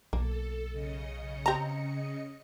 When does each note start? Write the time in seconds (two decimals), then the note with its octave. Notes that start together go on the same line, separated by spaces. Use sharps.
0.13 B1 A#3 A4
0.72 C#3 D#5 C#7
1.46 C4 G4 A5 A#5